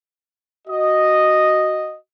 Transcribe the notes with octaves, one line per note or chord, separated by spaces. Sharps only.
F#4 D#5